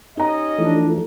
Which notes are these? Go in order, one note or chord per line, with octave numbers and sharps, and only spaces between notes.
C#4 D#4 G4 D#5 A#5
E3 F3 A3 D4